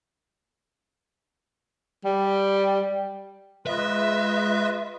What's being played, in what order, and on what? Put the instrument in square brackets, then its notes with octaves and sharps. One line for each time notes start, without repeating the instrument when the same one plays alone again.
[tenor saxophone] G3
[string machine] G#3 [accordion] F4 B4 D#5 [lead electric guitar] E5